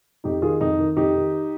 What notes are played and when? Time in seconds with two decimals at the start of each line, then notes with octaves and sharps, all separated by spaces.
0.24 F2 D#4 G4
0.42 D#3 F4 G#4
0.61 F2 D#4
0.78 D#3
0.96 F2 D#4 G4
1.15 D#3